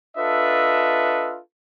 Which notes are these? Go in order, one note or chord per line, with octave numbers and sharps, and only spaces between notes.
D4 F4 A4 B4 D#5 E5